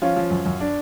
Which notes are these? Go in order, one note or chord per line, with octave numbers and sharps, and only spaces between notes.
F3 C#4 F4
F3
F#2
F#2
D4